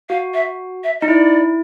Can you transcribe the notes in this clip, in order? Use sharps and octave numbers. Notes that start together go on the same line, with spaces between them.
F#4 F5
E5
E5
D#4 D#5
E4 D5